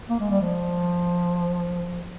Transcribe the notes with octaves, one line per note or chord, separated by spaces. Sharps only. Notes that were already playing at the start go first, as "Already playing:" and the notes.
A#3
G#3
G3
F3